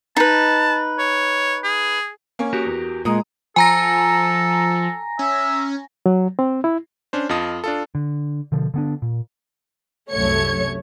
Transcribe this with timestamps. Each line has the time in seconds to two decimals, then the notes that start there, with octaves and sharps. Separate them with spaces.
0.17 D#4 B4 A5
0.99 C#5
1.64 G#4
2.39 A#3 C#4
2.53 F#4 G4 A#4
2.65 E2
3.05 A#2 G#3 A#5 D#6
3.56 F3 A4 G#5 A#5 A#6
5.19 C#4 E5
6.06 F#3
6.39 C4
6.64 E4
7.13 C#4 D4 C5
7.29 F2 F4 D#5 A5 D#6
7.64 D4 F4 A4
7.95 D3
8.52 B2 D3 F3
8.74 D3 B3 D4
9.02 A#2
10.10 C2 F#2 A3 C#5 G#6 C#7